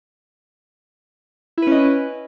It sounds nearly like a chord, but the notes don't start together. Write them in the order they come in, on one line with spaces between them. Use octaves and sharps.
E4 B4 C#4 D#5